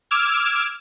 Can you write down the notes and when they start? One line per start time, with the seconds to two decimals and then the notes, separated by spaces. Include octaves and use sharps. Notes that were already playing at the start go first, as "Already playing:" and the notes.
0.11 D6 E6 F6 G#6